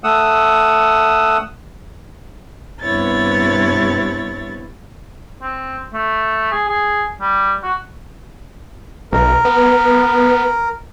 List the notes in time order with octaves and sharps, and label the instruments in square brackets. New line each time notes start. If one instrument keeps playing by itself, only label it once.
[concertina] A3 F#5 D#6 E6
[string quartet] G2 C3 B3 E4 C#5 A6
[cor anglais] C4
A3
G#4
G#4
G3
F#4
[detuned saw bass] B1 [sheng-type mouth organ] A#4
[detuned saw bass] B3